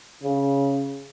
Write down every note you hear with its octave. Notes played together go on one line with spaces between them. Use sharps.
C#3